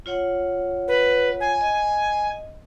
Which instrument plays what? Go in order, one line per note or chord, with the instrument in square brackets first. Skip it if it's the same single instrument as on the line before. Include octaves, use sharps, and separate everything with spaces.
[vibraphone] F4 C#5 F#5
[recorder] B4
G#5
[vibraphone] D#5